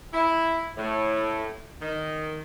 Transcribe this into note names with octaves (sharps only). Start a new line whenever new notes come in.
E4
A2
D#3